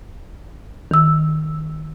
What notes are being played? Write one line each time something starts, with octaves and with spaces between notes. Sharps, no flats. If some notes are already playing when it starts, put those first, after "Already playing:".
D#3 E6